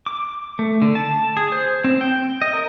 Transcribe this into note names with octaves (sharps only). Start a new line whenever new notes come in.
D6
A3
D3
A5
G#4
C5
C4
G5
D#5
A#4